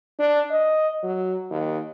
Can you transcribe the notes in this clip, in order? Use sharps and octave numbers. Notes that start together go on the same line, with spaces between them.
D4
D#5
F#3
D#2